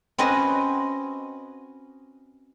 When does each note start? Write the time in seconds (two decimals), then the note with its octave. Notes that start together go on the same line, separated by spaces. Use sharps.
0.18 C4 C#4 F#4 B4 D#5 F#5